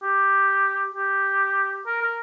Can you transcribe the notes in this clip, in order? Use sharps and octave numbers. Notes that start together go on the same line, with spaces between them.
G4
G4
A#4
A#4